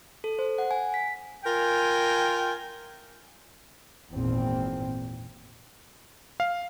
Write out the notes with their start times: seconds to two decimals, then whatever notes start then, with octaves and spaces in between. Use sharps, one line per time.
0.24 A4
0.39 C5
0.58 F#5
0.71 G#5
0.94 B6
1.45 F4 A#4 G5 G#5
4.12 G#1 E2 A#2 C4
6.40 F5